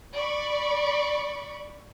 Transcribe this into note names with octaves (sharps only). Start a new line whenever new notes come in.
D5 B5 C#6